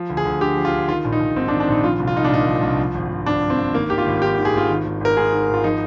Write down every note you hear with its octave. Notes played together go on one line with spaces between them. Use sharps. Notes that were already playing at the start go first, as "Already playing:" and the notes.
Already playing: F3
D2
G#4
D2
D3 G4
F3
F4
D2
D#3 F4
A#1
D#4
A#1
G#2 C4
D4
D#3
D4
A#1 D#4
F3 F4
C2
F4
C2 D#4
D4
A#2 D#4
F3
C2
F3
G#1
G#1
G2 D4
F3
C4
G#1
D#3 A#3
G#1 G4
F4
G#1
G#2 G4
D#3
G#4
G#1 F4
D#3
G#1
G#1 A#4
G#2 G#4
D#3
G#1 F4
F3 D#4